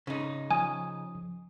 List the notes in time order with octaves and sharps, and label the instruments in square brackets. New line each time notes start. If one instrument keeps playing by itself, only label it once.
[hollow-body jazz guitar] C#3 D#4
[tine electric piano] F3 D#6 [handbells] G#5